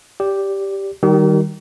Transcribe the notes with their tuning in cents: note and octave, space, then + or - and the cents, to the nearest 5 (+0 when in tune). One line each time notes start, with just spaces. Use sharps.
G4 +0 D5 -20
D#3 +0 G3 +0 G4 -45